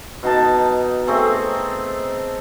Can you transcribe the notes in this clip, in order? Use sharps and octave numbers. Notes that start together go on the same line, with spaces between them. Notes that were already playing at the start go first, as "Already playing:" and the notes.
B2 D#4 A5
A3 C4 G#4